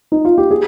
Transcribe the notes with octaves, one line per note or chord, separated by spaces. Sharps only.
D#4
F4
G4
G#4